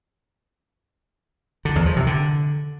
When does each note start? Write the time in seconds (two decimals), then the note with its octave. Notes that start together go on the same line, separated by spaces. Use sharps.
1.65 D3
1.76 E2
1.86 F3
1.96 C3
2.07 D3